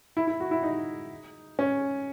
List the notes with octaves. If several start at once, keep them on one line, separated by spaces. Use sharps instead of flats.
E4
E4
F#4
E4
D#4
C#4